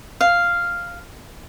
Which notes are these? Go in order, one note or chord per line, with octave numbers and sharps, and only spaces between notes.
F5